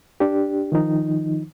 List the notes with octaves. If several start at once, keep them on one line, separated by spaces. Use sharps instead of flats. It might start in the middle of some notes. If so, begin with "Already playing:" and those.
D4 G4
D#3 F3 D#4